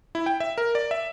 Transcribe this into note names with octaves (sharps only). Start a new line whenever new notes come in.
E4
G5
E5
A#4
D5
E5